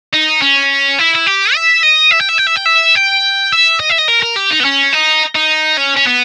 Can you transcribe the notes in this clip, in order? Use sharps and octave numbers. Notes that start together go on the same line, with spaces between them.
D#4
C#4
E4
E4
G4
E5
D#5
E5
G5
E5
G5
E5
G5
E5
G5
E5
D#5
E5
D#5
A#4
A#4
G4
D#4
B3
C#4
D#4
D#4
C#4
C#4
B3